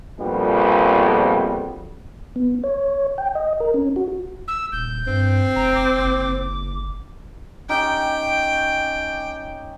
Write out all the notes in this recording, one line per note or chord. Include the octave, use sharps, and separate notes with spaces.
A#1 F2 B2 G3 B3
B3
C#5
G5
D#5
A#4
C#4
F#4
E6
D#1 G6
G2 C4
F1 A#5
D6
F#1
C#4 D#4 G4 G5